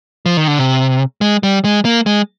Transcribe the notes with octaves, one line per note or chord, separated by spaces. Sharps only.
F3
D#3
D3
C3
G#3
G3
G#3
A#3
G#3